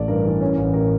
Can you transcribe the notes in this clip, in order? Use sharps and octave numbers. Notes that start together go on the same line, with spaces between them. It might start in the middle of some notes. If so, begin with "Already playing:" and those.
Already playing: A1 A3 D5
G2 A#4
E3
C#4
A1
A2 A#4